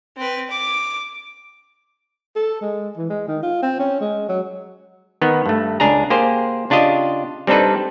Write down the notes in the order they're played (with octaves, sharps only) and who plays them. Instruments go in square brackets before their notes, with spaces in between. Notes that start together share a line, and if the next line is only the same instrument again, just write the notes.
[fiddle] C4 B4
D6
[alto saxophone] A4
G#3
E3
G#3
D#3
F4
C4
C#4
G#3
F#3
[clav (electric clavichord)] D#3 B3
G2 A3
C#2 D4 G#4 A#5
A#3 G4 G#4 C5
C#3 D4 F4 G4 D#5
G3 C4 D4 D#4 A4 B4